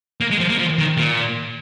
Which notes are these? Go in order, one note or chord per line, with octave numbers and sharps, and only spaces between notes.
A#3
G#3
F3
A#3
F3
D#3
A#2